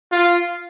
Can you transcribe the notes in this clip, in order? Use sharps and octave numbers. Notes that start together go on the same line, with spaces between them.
F4